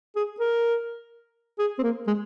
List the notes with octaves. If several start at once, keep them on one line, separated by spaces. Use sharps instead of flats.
G#4
A#4
G#4
C4
A#3
G#3